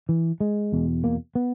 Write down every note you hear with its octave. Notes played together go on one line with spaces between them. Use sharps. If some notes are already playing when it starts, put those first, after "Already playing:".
E3
G#3
E2 B2
A#3
B3